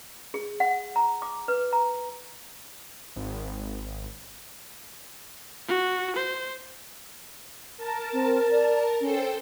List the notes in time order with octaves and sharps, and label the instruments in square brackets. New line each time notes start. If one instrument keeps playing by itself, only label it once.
[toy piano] G#4
F#5
A#5
D6
B4
A#5
[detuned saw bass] G#1
[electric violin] F#4
C5
[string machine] A#4 A5
[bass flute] C4
D5
[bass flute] C#4 [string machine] A4 C5 G5